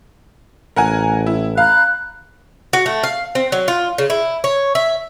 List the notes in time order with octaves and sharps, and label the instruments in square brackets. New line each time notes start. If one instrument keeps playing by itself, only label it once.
[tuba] A1 [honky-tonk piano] A#4 F#5 G#5
[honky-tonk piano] E4
[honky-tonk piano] F5 [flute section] A#5 B5 F#6
[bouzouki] F#4
A3
F5
C4
F#3
F4
C#3
E4
C#5
E5